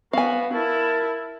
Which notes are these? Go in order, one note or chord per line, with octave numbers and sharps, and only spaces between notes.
B3 F#4 F5 G#5
E4 A#4 A5